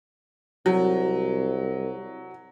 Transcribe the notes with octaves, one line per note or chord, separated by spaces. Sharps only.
C2 F#3